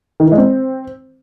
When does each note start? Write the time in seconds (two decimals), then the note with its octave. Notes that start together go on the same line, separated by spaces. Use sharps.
0.20 D#3
0.26 E3
0.32 G#3
0.38 C4